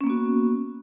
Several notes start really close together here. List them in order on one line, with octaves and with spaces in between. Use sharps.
C#4 A#3 B3 F#4